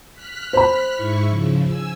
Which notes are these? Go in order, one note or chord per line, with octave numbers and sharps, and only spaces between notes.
F6 F#6 B6
C5 B5
G#2 E4 C#6
C#3 F3
G#5 E6